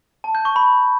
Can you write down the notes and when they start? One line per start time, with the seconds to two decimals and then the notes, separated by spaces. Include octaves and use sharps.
0.24 A5
0.35 G6
0.45 C#6
0.56 B5